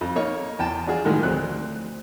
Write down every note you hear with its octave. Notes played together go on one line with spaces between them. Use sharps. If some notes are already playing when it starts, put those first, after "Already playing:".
F2
A#3 D#4 C#5 C#6
E2 G5 A5
D4 F4 F#4 G#4
A2 D#3 F3 F#3 G#3
D2 C4 F#6